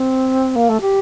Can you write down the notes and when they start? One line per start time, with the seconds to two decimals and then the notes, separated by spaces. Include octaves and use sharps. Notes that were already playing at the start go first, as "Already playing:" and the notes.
Already playing: C4
0.55 A#3
0.69 A3
0.81 G4